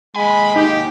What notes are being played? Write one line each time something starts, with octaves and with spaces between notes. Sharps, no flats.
D#2 G#3 G#5 B5
D#4 G4